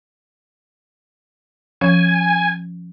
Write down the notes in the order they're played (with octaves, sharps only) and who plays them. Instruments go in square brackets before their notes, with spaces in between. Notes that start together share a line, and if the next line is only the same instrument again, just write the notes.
[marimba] F3 C#4 C#5 [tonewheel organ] G#5